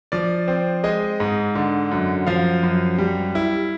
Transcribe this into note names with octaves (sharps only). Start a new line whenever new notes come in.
F3 D5
C4
G#3 D#5
G#2
D3
F#2
F3 F5
F#2
G3
E4